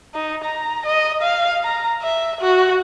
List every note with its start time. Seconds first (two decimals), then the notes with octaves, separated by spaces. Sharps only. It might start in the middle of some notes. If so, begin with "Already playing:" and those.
0.14 D#4
0.44 A#5
0.86 D#5
1.22 F5
1.64 A#5
2.02 E5
2.41 F#4